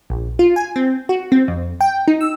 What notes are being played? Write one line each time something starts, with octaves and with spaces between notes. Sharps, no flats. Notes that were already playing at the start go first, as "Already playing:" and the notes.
A#1
F4
G#5
C4
F#4
C4
F2
G5
D#4
E6